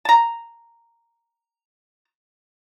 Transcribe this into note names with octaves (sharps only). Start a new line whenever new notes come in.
A5 A#5